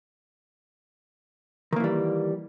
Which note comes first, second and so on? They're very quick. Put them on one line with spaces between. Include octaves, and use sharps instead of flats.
D#3 A#3 E3 G3